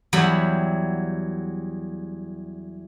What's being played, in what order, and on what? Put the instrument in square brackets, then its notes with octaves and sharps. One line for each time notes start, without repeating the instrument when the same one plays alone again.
[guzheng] E2 F#3 G3 E5 B5